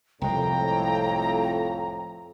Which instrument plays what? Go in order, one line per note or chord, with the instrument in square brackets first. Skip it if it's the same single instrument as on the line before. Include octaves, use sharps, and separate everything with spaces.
[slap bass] C2 G#3 [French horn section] F2 A2 [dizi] G5 [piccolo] A#5